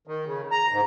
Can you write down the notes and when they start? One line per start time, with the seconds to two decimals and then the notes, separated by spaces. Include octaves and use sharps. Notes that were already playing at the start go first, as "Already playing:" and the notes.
0.07 D#3
0.26 C#3
0.51 A#5
0.71 G#2